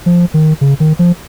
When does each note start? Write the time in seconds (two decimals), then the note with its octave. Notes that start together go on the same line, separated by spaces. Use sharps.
0.06 F3
0.34 D#3
0.61 C#3
0.80 D#3
0.99 F3